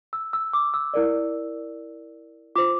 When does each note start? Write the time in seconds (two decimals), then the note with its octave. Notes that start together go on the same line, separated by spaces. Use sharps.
0.13 E6
0.33 E6
0.53 D6
0.74 E6
0.94 E4 A#4 D5
2.56 F4 C5 D6